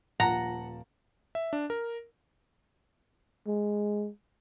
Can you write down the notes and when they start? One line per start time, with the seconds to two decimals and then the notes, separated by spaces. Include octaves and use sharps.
0.20 D#1 F3 F#5 A5 A#5
1.35 E5
1.53 D4
1.70 A#4
3.47 G#3